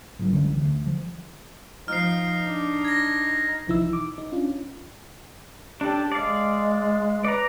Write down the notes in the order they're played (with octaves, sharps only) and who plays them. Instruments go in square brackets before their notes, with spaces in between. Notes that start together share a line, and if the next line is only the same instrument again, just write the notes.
[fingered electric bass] G1 F#3
C2 D3 E3
D2
F3
[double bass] F3 [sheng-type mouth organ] D#4 [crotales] F6 C7
[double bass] D4
[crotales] G#6 A#6
[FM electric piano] B1 E3 F3 D#4 E4 E6
D6
D#4
C#4 D4 F4
[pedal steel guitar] D4 A4 [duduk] G4
[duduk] G#3 [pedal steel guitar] D5 F5
[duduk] B4 [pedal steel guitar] D5 A#5